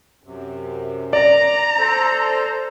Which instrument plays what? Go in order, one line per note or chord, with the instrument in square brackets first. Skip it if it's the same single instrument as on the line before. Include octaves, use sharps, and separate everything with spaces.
[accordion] F#2 C3
[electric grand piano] D5 [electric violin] A#5
[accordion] A4 C5